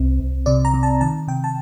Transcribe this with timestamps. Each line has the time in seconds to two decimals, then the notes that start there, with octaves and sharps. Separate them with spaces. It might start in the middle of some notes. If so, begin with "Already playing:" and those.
Already playing: C2 C4
0.20 C2
0.46 C3 D5
0.65 A#5
0.74 C3
0.83 A5
1.01 D#3 A5
1.28 C3 G5
1.44 A5